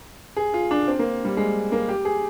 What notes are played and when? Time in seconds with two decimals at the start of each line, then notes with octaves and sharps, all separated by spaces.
0.37 G#4
0.54 F4
0.71 D4
0.88 C4
0.99 A#3
1.25 G3
1.37 G#3
1.72 A#3
1.89 G4
2.05 G#4